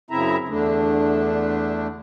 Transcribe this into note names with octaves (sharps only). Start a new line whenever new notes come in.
F#2 C#3 C4 E4 E5 A#5
E2 D3 A3 D4